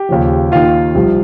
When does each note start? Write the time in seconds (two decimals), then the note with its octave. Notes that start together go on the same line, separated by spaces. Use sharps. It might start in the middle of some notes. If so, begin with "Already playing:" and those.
Already playing: G4 G5
0.09 D#2 C#3 F3
0.52 D#2 D#3 F4 F5
0.95 C2 C3 F3